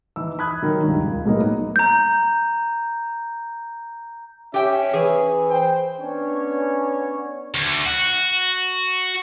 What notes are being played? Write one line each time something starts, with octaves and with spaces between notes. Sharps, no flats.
E3 D#4 E6
B5 D#6 F#6 G#6
D#3 F#3
C#2 G2
C#2
A2 F#3 G#3 A#3 B3 D#4
A#5 G6
C#4 G4 E5 G5
E3 G#4
C5 G5
B3 C#4 D4 C#5
D2
F#4